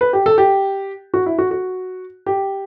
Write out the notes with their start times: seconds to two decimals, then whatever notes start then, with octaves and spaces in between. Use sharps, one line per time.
0.01 B4
0.13 G4
0.26 A4
0.38 G4
1.14 F#4
1.26 E4
1.38 F#4
1.51 F#4
2.26 G4